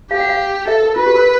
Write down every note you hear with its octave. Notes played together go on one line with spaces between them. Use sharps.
G4 F5
F#5
F5
A4 E5
A#4
F4 B4
G4
A#4